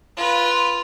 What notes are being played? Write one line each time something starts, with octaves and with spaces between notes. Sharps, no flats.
F4 B4